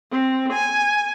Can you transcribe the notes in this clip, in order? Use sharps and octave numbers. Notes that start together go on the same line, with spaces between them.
C4
G#5